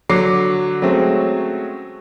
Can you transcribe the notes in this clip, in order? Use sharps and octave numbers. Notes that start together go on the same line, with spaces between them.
D3 F#3 D6 C7
F#3 G#3 A3 C4 C#4